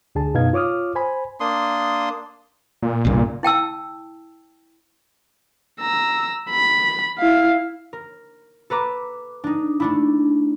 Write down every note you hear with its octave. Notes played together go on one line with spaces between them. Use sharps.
D2 D3 G#4 A5
F#2 B2 B3 D#4 F5 G#6
F4 C#5 D6 D#6 F6
C5 G#5 B5
A#3 D4 C6 D#6
A#2
B1 G2 C#3
E4 G5 A5 E6
A#5 E6
B5
E4 F5
A#4
A4 B4 A#5 D6
D4 D#4
A3 D4 E4